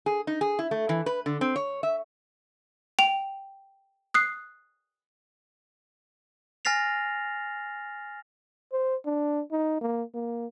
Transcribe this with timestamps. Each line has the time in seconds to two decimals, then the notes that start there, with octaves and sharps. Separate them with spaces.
0.06 G#4
0.27 D#4
0.41 G#4
0.59 E4
0.71 A3
0.89 E3
1.06 B4
1.26 D3
1.41 C4
1.56 C#5
1.83 E5
2.99 G5 F7
4.14 D#6 F#6 C7
6.65 G#5 F6 A6 A#6 C7 F7
8.72 C5
9.06 D4
9.52 D#4
9.81 A#3
10.14 A#3